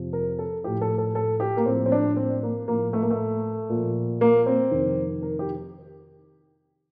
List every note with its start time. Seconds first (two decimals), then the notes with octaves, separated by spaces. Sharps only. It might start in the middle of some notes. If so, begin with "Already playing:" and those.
Already playing: F2 C3 F3
0.13 A#4
0.39 A4
0.63 A2 F3 G4
0.81 A4
0.98 A4
1.15 A4
1.40 G4
1.57 A#3
1.66 A2 F3 C4
1.86 C4
1.92 D4
2.16 C4
2.43 A#3
2.68 A2 F3 A#3
2.93 A3
3.02 A#3
3.10 A3
3.69 A#2 F3
4.21 A#3
4.46 C4
4.71 F2 C3 D#3
5.23 A#4
5.39 G4